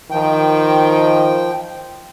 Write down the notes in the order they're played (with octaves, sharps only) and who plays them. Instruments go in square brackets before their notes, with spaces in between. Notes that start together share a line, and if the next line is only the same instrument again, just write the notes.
[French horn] D#3 [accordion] F3 G5